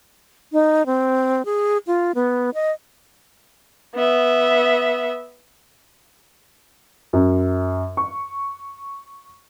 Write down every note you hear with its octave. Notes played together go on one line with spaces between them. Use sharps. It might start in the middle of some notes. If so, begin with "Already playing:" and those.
D#4
C4
G#4
F4
B3
D#5
B3 E5
F#2
C#6